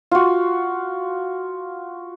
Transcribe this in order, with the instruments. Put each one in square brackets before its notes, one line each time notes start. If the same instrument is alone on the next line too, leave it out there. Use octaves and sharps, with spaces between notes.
[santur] F4 F#4